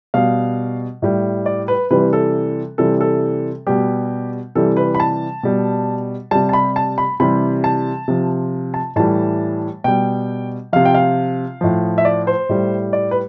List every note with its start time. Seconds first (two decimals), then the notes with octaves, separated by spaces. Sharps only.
0.14 B2 G3 F5
1.02 A2 G3
1.46 D5
1.68 B4
1.90 C3 E3 G3 B4
2.13 A4
2.78 C3 E3 G3 A4
3.01 A4
3.67 B2 G3 G4
4.55 C3 E3 G3 A4
4.77 B4
4.95 B5
5.00 A5
5.43 B2 G3
6.31 C3 G3 A5
6.49 A5
6.53 B5
6.76 A5
6.98 B5
7.20 C3 E3 G3 B5
7.64 A5
8.08 C3 F3
8.74 A5
8.96 A2 E3 G3 A5
9.84 B2 G3 G5
10.73 C3 F3 F5
10.85 G5
10.94 F5
11.61 A2 F3
11.98 E5
12.05 D5
12.27 C5
12.49 A2 G3
12.93 D5
13.11 B4